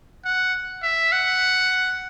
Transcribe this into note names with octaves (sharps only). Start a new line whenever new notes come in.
F#5
E5
F#5